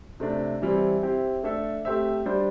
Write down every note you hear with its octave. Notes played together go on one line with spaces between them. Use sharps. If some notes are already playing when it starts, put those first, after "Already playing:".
C3 A3 D4
E3 G3 C4 E4
C4 E4 G4
A3 D4 A4 E5
A3 C4 G4 C5 E5
G3 D4 C5